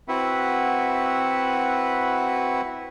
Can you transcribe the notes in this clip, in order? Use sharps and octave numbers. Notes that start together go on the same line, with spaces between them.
C4 E4 F#4 B4 E5 F#5